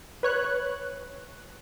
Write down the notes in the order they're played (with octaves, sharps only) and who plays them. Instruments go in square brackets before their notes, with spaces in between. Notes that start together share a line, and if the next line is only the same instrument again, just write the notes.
[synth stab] B4 C#5 F#6